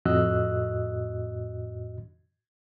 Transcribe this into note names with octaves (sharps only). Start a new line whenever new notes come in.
F2 A2 F#4 D#5 E6 F#6